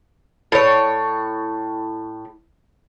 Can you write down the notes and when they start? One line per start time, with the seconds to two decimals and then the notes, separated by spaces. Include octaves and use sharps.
0.52 A2 C#5